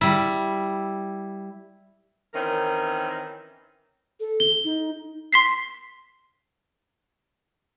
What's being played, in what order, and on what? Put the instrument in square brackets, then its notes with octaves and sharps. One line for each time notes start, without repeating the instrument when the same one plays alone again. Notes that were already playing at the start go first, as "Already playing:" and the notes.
[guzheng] G3 E4
[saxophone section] D#3 E3 C4 C#4 A#4
[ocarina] A4
[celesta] G7
[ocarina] D#4
[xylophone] C6 B6 C7